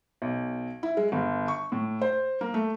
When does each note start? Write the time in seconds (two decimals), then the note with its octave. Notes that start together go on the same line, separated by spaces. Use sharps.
0.22 B1
0.83 E4
0.97 G#3
1.12 G1
1.48 C#6
1.72 A2
2.01 C5
2.41 A#3
2.54 A3